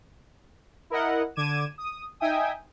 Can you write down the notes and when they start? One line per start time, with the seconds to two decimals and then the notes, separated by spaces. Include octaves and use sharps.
0.90 E4 A#4 D#5 F#5
1.36 D3 D6 G#6 D#7 E7
1.78 D#6
2.20 D#4 E5 G5 G#5 D#6